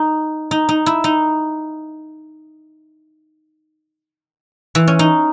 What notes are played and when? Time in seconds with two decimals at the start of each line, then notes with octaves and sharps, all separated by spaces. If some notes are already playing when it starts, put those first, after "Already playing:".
Already playing: D#4
0.51 D#4
0.69 D#4
0.86 E4
1.04 D#4
4.75 E3
4.88 C#4
4.99 D#4